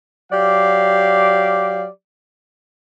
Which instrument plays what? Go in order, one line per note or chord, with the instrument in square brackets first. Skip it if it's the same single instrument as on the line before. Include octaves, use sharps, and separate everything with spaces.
[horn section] F#3 G4 D5 F5